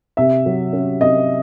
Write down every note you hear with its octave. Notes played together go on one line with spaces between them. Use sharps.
C3 E5
F#3
C#4
C3 D#5